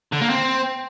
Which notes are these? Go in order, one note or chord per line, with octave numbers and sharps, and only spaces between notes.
D3
A#3
C4